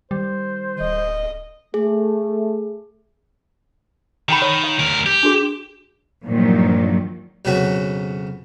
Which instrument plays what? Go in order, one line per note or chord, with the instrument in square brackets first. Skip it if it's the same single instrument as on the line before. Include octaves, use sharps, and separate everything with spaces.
[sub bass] D#3 [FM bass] G3 [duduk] C5
[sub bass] D1 [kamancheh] D#5
[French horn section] A3 [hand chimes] G#4
[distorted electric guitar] D#3 [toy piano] F#5 G5 B5
[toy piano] C#5
F5
[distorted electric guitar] D2 A#4
G4
[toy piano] D4 F#4 G#4
[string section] G2 A#2 D#3 F3 F#3
[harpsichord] B1 F2 C#3 F#3 B3 F#4